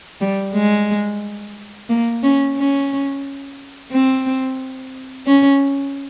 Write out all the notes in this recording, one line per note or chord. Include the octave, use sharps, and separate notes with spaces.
G3
G#3
A#3
C#4
C#4
C4
C#4